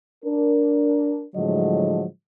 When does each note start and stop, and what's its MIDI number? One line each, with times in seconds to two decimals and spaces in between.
0.25 1.22 62
0.25 1.22 70
1.35 2.04 45
1.35 2.04 50
1.35 2.04 53
1.35 2.04 54
1.35 2.04 56
1.35 2.04 75